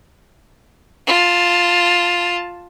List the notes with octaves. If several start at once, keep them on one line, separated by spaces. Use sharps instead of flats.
F4 A5